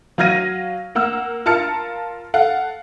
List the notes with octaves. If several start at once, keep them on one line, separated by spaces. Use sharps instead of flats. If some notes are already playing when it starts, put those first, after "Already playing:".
F#3 F5 F6 G#6 A#6 D#7
A#3 F#5 E6 F6
F4 A#4 A5 F6 C#7
A4 F5 F#5